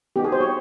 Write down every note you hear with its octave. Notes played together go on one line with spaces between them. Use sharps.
B3 D#4 F#4 G4
G#4
C5
C#5